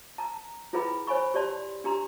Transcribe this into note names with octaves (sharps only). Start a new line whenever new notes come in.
A5 A#5
E4 F4 G#4 B4 G5 B5
C5 C#5 G#5 B5 C#6
G4 C#5 D5 A5 C6
D4 G4 A#5 C6